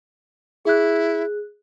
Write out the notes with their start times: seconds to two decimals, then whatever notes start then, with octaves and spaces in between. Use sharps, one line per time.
0.65 E4 G#4 F#6